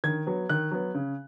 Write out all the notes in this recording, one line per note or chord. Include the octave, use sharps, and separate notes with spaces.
D#3 G#6
F#3 B3
D#3 F#6
F#3 B3
C#3